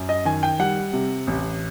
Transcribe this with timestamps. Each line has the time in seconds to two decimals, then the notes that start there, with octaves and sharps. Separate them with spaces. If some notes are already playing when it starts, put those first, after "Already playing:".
Already playing: F#2
0.09 D#5
0.25 D#3 G#5
0.43 G5
0.59 G3 F#5
0.93 C3
1.27 A1